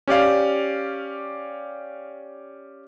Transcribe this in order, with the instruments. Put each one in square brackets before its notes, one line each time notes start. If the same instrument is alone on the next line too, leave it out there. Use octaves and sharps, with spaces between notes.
[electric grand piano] C#4 G4 D5 F5